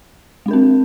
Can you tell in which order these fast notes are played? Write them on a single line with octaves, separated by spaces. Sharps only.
G#3 D4 A#4 C4